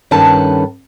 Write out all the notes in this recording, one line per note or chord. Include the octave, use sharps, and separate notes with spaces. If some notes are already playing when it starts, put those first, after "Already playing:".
G2 D#3 C#4 A4 B4 A5